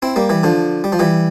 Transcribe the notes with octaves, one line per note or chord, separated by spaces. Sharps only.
C4 E4
G3 A#3
E3 G3
D3 F3
G3
F3
E3 G3